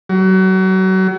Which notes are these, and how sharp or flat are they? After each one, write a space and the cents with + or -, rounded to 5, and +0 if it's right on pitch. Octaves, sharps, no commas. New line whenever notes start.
F#3 +30